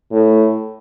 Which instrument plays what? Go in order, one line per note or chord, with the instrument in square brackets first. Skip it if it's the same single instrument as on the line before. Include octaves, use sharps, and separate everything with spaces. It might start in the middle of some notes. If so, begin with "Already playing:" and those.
[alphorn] A2